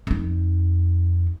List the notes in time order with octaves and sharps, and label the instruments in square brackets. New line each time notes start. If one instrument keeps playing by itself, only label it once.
[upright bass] F2 D#4